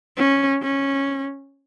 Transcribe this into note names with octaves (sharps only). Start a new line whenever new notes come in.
C#4
C#4